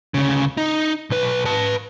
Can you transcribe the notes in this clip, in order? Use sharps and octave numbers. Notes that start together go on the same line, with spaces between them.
D2 C#3
D#4
B1 B4
B4 A5